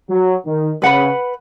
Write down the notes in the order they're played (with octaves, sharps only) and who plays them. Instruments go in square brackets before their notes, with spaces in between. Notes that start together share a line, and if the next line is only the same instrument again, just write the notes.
[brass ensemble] F#3
D#3
[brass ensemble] C#3 [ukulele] B4 F#5 B5